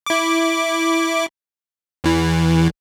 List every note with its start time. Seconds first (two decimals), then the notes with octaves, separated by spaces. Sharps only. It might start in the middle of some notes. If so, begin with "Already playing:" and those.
0.06 E4 D6
2.04 E2 E3